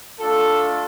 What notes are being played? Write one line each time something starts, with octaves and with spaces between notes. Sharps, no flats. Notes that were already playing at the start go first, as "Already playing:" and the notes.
A3 D4 F4 A4